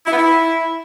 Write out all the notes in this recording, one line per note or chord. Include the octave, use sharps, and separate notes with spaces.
E4
B3
E4